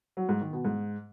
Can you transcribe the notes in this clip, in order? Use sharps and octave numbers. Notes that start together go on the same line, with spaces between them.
F#3
G#2
D#3
B2
G#2